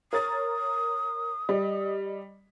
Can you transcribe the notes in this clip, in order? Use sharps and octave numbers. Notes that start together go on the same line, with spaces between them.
A#4 C#5 D#6 A6
G3 D#5